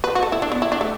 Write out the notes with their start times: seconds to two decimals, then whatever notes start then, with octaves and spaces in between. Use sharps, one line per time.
0.04 B4
0.15 F#4
0.23 A4
0.32 E4
0.42 D4
0.52 B3
0.62 E4
0.72 D4
0.81 A3